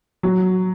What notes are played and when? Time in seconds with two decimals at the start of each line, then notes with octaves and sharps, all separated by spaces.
0.23 F#3